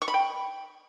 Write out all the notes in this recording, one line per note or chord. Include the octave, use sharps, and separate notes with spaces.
C#6
B5
G5